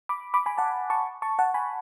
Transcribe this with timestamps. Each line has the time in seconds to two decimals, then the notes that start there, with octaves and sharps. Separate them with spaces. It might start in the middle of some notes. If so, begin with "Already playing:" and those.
0.09 B5 D6
0.34 B5 D6
0.46 G#5 B5
0.58 F#5 A5
0.90 A5 C#6
1.22 A5 C#6
1.39 F#5 A5
1.54 G#5 B5